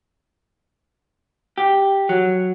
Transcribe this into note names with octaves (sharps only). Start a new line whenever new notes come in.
G4
F#3